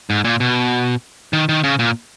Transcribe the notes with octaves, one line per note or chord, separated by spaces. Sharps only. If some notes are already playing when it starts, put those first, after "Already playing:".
G#2
A#2
B2
D#3
D#3
C#3
A#2